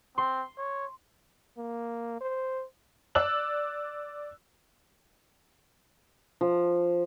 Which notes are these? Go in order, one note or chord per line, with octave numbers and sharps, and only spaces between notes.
C4 C6
C#5
A#3
C5
D5 E6 F#6 F#7
F3